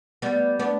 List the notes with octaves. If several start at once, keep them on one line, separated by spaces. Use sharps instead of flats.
G3 B3
B3 D4